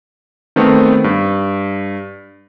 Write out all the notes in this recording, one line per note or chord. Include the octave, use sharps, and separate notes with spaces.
D#3 A3 B3 C4
G2